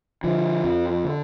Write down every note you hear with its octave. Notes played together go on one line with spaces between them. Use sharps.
D3 F3
F2
D3